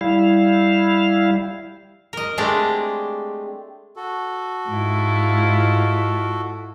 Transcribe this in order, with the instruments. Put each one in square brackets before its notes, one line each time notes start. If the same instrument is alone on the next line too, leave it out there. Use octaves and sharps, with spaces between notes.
[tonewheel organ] G3 E4 F5
[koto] A#4 D#5
G#3 A3 C4 D4 G4
[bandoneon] F#4 A4
[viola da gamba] G#2 E4 F4